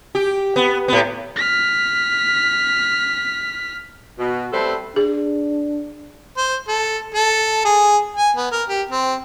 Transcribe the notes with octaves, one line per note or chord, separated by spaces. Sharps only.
G4
B3
A2 B3
F6 B6
B2
G3 A3 C4 A4 B4 C5
D4 G#4
C5
A4
A4
G#4
G#5
B3
A#4
G4
C4